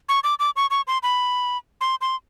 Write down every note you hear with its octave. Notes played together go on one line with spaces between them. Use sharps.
C#6
D6
D6
C#6
C#6
C6
B5
C6
C6